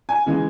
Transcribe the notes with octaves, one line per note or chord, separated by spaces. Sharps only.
G#5
C#3 E3 G#3